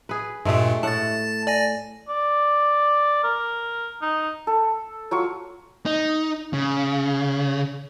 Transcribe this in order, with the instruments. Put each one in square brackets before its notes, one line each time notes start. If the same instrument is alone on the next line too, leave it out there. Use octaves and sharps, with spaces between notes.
[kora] G#4 B4
[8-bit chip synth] G2 A#2 [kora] G#3 A3 G4
[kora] A2 F#5 [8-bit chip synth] A5 A6
[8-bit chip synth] D5 G#5 A#6
[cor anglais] D5
A#4
D#4
[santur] A4
F#3 F4 C#6
[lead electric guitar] D#4
C#3